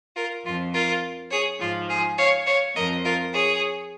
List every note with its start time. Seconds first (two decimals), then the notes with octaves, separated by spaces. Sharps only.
0.16 F4 A#4
0.44 F2 F3 F4
0.73 F4 A#4
1.31 G#4 C#5
1.60 G#2 F3 F4
1.89 G#4
2.17 C#5 F5
2.46 C#5 F5
2.75 F2 F3 A#4 D#5
3.04 F4 A#4
3.33 G#4 C#5